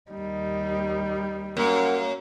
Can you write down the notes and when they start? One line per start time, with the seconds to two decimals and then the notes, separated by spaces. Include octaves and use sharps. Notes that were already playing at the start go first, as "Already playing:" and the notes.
0.10 D#2 G3 D#4
1.57 F#2 A#3